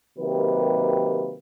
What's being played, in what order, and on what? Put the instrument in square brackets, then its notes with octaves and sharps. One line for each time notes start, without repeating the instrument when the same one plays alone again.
[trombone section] C3 D#3 F#3 A#3 G4 B4